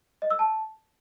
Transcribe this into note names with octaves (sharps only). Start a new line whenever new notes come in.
D#5
E6
A5